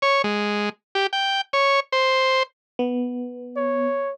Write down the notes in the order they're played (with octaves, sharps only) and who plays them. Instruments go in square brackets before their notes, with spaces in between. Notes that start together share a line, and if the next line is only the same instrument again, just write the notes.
[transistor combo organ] C#5
G#3
G4
G5
C#5
C5
[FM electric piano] B3
[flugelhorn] C#5